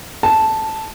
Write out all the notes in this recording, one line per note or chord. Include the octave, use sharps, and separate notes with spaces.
A5